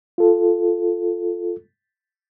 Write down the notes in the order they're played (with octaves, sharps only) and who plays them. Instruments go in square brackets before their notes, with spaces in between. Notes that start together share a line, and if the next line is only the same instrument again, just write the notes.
[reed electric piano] F4 A4